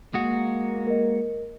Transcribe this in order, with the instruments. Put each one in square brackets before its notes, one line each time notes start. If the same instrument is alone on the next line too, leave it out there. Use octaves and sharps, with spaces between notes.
[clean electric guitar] G#3 F#4 [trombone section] A#3 [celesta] D#6
[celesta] A#4 D#5